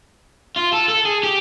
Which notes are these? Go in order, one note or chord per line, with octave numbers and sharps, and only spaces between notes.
F4
A4
A4
G#4
G4